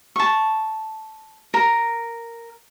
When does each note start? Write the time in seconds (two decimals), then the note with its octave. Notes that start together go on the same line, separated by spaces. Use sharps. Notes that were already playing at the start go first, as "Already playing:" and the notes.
0.16 A5 C#6
1.54 A#4